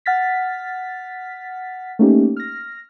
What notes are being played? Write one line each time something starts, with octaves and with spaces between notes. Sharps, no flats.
F#5 F6 A6 B6
A3 A#3 C#4 D#4 G4
F6 A#6